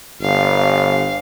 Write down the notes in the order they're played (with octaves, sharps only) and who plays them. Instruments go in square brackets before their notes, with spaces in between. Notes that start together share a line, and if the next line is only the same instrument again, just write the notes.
[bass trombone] G1 [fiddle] F5